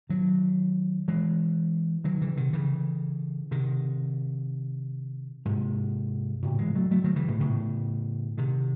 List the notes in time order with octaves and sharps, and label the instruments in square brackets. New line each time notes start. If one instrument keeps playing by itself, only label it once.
[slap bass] D#3 F#3
E3 G#3
D#3 F#3
C#3 E3
C3 D#3
C#3 E3
C3 D#3
G#2 C3
A2 C#3
E3 G#3
F#3 A3
F#3 A3
D#3 F#3
C#3 E3
A2 C#3
A2 C#3
C3 D#3